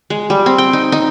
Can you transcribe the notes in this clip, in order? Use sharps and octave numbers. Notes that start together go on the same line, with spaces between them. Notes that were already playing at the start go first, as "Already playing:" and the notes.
G#3
G3
C4
G5
D#4
D#4